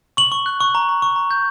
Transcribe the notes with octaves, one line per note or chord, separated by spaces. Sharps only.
C#6 F#7
C#6
F#6
C#6
A#5
A#5
C#6
A#5
G6